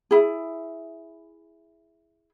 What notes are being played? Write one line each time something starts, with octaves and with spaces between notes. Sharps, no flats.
E4 G#4